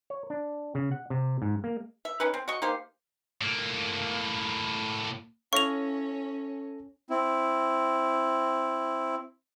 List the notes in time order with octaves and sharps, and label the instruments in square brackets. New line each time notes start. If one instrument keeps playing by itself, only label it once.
[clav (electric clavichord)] C#5
D4
C#3
F#5
C3
G#2
A#3
[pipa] E5
C#4 D#4 B4
C4
F#4 D#5 C#6
A#3 D#4 G4 C5
[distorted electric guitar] A2 A#3
[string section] C#4 [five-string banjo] E4 C#5 F5 [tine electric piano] A4 A#6 [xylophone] C#6 F7
[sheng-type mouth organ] C4 E4